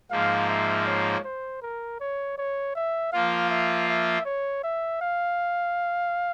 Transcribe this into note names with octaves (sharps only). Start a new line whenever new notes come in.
G#2 F3 A#3 F5
E5
C#5
C5
A#4
C#5
C#5
E5
F3 A#3 F4 F5
E5
E5
C#5
E5
F5